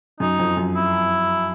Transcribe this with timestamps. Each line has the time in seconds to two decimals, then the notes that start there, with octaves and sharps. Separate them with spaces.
0.20 F#2 D#4
0.39 F2
0.57 F#2
0.76 E4